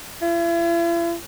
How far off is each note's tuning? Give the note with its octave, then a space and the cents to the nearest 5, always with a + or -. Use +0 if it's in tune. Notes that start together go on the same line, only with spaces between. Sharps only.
E4 +45